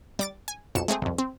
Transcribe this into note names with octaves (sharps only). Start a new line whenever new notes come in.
G3 D6 A6
G#5
B1 F2 C#7 E7
G#3 A3 C4 G#4
C2 F2
C4